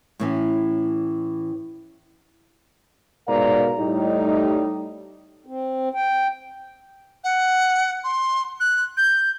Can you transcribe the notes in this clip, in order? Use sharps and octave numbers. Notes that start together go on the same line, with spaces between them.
A2 E3 C#4
G#2 B2 A#4 D5 F5 A#5
A2 G3 D#4
C4
G5
F#5
C6
F#6
G6